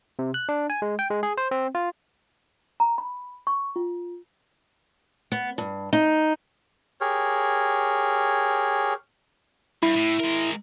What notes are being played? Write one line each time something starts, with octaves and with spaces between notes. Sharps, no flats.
C3
F#6
D4
G#5
G#3
G5
G#3
G#4
C5
C4
F4
A#5
B5
C#6
F4
B3
G2
D#4
G4 G#4 A#4 C#5
G2 E4
A2
G#3 A#4